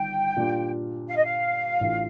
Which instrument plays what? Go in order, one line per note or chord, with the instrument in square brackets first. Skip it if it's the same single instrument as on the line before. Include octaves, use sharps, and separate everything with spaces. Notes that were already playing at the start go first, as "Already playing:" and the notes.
Already playing: [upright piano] G1 G2 D#3 [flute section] G5
[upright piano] A#2 G3 D4 F4
[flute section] F5
D#5
F5
[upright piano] A1 A2 A3 D4 F4